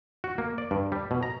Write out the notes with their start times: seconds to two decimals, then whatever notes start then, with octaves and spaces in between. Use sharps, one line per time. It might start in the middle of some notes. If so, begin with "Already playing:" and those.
0.24 F#4
0.38 A#3
0.58 D5
0.71 G2
0.92 G3
1.11 B2
1.23 A#5